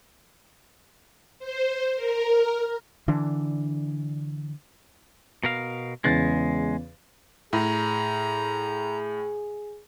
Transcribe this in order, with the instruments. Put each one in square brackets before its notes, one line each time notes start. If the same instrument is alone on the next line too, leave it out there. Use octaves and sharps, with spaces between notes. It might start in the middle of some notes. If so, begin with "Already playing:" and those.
[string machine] C5
A#4
[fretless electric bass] D3 E3 D4
[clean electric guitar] B2 A#4 F5
[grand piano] E2 C#3 A6 [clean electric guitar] G#3
[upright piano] A2 [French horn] G#4 [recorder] A#5